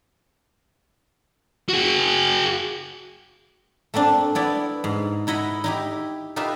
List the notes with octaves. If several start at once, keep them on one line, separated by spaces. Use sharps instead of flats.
F#4 G#4
A3 A#3 C4 D4
B3 E4 D5
G#2
D#4 E4 D#5 F#5 B5
D#4 E4 G4
D#4 F4 G4 B4 E5